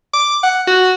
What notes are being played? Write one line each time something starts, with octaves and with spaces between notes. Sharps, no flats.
D6
F#5
F#4